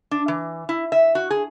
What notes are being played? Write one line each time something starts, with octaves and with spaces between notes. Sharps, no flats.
D4
E3
E4
E5
F#4
G#4